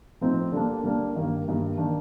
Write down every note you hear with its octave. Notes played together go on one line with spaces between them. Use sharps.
A2 F3 C4 D#4
D3 G3 A#3 D4
D3 G3 A#3 D4
G2 D#3 A#3
G2 D#3 A#3
D#3 A#3 D4